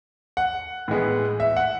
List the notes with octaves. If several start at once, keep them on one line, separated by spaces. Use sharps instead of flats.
F#5
A2 E3 G#3 B3
E5
F#5